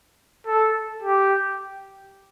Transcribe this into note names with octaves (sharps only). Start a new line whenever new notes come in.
A4
G4